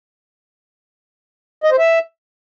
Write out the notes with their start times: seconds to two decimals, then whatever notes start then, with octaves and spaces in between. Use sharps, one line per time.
1.64 D#5
1.71 C5
1.79 E5